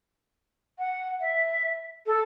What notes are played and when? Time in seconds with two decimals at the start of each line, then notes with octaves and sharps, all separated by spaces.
0.78 F#5
1.20 E5
2.06 A4